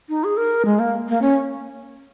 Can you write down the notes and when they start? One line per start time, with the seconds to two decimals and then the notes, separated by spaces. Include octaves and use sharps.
0.09 D#4
0.24 G#4
0.37 A#4
0.65 G#3
0.79 A#3
1.09 A#3
1.22 C#4